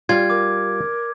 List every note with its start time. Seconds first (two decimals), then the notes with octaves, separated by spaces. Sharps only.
0.09 G3 F4 G#6
0.30 A#4 D6